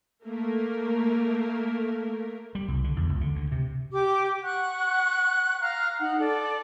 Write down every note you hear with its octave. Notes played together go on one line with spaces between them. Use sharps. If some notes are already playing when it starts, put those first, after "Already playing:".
A3 A#3 A#4
G3
C2
D3
E2
C#2
D3
D2
C3
G4 D6
F#5 C#6 F#6
F5 A#5 F6 F#6
D#4 F#5
A4 D5